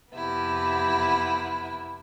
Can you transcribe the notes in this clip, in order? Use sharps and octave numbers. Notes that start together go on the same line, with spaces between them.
F2 C3 B3 E4